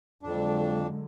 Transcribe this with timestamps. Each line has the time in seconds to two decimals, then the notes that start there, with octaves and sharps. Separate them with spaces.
0.23 F2 D3 F#3 G#3 D4